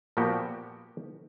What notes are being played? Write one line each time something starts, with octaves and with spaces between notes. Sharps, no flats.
A#2 F3 A#3 B3 F#4 G4